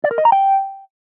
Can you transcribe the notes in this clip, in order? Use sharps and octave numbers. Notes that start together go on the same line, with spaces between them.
D5
A#4
D#5
A#5
G5